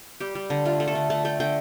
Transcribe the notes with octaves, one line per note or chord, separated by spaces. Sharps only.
G3 G4
G3
D3
A3 F4
A3
A4
D3
A3 A5
A3 G5
D3 G5